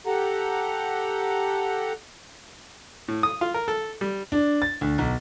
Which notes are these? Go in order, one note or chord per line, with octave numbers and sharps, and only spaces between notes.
G4 A4 F#5 A#5
A2
D#6
F4
A#4
A4
G3
D4
A6
D2
B1